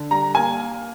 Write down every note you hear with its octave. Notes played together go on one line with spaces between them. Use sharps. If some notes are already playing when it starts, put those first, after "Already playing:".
Already playing: D3
G3 A#5
A#3 G#5